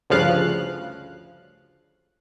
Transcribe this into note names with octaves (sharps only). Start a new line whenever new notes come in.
D2 G2 C#3 F3 F5 F#6